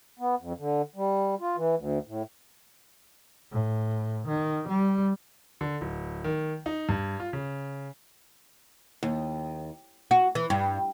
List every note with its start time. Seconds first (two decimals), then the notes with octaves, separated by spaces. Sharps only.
0.19 B3
0.39 F2
0.58 D3
0.96 G3
1.40 F4
1.57 E3
1.77 D2
2.07 A2
3.52 A2
4.28 D#3
4.68 G3
5.61 D3
5.81 D1
6.24 D#3
6.66 D#4
6.89 G2
7.20 F4
7.33 C#3
9.03 D#2
10.11 F#4
10.35 E3
10.50 G2